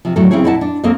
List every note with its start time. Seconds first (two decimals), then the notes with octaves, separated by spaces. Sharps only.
0.05 C3 F3
0.16 A2 F#3 A4
0.31 C#3 C4 E4 G#4 C#5
0.44 A#2 E4 D#5 F#5 A5
0.61 D4
0.84 A#3 C4 A4 C#5 D#5